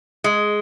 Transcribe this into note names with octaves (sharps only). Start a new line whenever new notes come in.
G#3